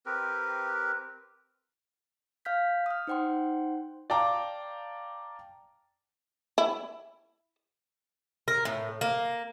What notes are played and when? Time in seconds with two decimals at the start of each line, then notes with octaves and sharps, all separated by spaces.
0.06 C4 G4 A#4 B4
2.45 F5 F6 G6 B6
2.86 D#6 F6
3.07 D#4 C5 F#5 G5 C6
4.10 D5 F5 G5 A5 A#5 D6
6.58 E4
8.48 A#4
8.65 A2
9.01 A#3